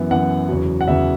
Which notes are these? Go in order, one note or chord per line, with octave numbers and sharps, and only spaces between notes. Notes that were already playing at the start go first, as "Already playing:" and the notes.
Already playing: F#2 E3 B3
F#2 E3 B3 F#5
E2 C#3 F#3
F#5
E2 C#3 F#3 E5